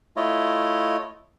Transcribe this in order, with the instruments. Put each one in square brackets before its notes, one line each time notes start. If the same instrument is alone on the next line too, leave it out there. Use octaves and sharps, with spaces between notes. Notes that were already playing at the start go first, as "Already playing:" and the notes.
[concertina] A3 E4 F4 C#5 D#5